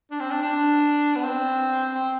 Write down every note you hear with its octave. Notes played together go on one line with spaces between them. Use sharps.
D4
C4
D4
D4
B3
C4
C4